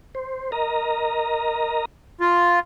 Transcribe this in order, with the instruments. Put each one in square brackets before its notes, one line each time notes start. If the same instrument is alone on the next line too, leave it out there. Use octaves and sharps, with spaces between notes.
[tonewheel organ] C5
A#4 D#5 A#5
[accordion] F4